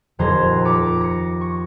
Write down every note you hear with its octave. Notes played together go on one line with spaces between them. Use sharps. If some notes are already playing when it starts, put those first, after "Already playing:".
D#1 F2 C5 A#5 G#6
A#5 D6 A6 B6 C#7
A#6 C#7
C#6